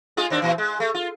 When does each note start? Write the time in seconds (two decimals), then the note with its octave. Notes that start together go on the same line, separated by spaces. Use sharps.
0.17 G#3 F4 G#4
0.30 D#2 C4 D4
0.42 A#2 E3
0.58 G#3
0.80 A3
0.95 F4